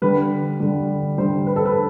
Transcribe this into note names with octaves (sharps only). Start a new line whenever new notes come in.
D3 G3 B4
D3 G3
D3 G3 C5
B4
A4
B4